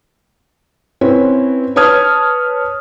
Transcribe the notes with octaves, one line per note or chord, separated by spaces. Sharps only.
C4 C#4 E4 B4 C#5
B4 C#5 A5 D#6 F6 G#6